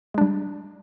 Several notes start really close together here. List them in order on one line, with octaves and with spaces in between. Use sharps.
G#3 D4 G3